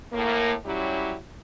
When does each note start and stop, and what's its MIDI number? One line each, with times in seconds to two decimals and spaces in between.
0.13 0.54 45
0.13 0.54 58
0.65 1.16 54
0.65 1.16 55
0.65 1.16 61
0.65 1.16 64
0.65 1.16 67